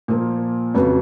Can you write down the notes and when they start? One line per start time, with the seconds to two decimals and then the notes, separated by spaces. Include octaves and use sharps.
0.08 A#2 F3 A#3
0.74 F2 C#3 F#3 B3 F#4